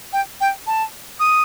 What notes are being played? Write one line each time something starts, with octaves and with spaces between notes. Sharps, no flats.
G5
G5
A5
D#6